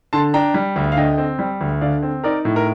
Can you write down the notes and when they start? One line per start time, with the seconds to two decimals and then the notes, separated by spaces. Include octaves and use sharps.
0.13 D3 A5 C6
0.34 D4 G5 A#5
0.54 G3
0.76 D2
0.92 F5
0.97 D3 D#5 G5
1.18 C4
1.39 G3
1.61 D2
1.81 D3 D5 F5
2.03 C4
2.24 D#4 A#4 D5
2.45 A2
2.56 A#4